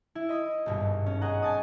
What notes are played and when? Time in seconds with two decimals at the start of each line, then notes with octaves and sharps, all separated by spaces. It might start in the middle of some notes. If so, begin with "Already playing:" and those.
0.15 E4
0.29 D#5 B5 D#6
0.66 G#1 G2 B2
1.06 C#4
1.21 G#4 D#5 F#5 A#5
1.42 G#5 A5 D#6